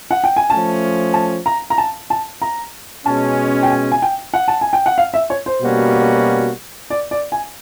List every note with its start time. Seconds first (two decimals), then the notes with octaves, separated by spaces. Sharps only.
0.11 F#5
0.24 G5
0.36 G#5
0.50 F3 A3 C#4 A5
1.14 A5
1.46 A#5
1.70 A#5
1.78 A5
2.10 A5
2.42 A#5
3.06 B2 G#3 C#4 A5
3.63 G5
3.70 G#5
3.92 G#5
4.02 G5
4.34 F#5
4.48 A5
4.61 G#5
4.73 G5
4.86 F#5
4.98 F5
5.14 E5
5.30 C#5
5.46 C5
5.62 B2 G3 A#3 C#4 F#4
6.90 D5
7.11 D5
7.32 G#5